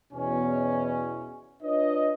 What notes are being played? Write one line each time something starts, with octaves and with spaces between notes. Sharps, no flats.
E2 B2 C#4
D4 F4 B4 C#5 D#5